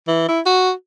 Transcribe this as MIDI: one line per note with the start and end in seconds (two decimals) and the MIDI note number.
0.08 0.24 52
0.28 0.40 64
0.46 0.71 66